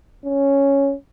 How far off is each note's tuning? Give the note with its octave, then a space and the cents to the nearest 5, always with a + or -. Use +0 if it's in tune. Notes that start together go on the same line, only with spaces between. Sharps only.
C#4 +0